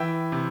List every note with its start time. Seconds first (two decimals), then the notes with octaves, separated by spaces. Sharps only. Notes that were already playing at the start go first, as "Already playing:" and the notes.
Already playing: E3 E5 G5
0.32 C3